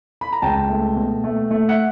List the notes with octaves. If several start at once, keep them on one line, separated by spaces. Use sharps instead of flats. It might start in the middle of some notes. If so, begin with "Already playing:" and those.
B5
A#5
C#2 G5 A5
A3
B2
A3
A3
E5 F#5